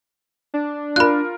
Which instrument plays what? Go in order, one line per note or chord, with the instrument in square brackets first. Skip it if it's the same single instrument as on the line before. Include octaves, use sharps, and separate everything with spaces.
[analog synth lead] D4
[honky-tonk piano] F4 A#4 [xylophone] B5 F#6